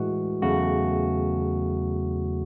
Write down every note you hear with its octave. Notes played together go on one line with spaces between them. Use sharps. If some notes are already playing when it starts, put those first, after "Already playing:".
Already playing: A2 E3 G#3 F#4
E2 C#3 F#3 A3 F#4